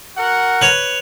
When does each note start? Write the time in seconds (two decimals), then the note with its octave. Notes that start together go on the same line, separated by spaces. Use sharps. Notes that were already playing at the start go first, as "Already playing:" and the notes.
0.17 F#4 A#4 F#5
0.62 B4 C#5